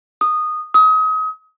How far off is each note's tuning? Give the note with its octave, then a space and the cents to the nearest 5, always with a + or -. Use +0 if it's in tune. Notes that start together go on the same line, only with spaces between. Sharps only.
D#6 -15
D#6 +30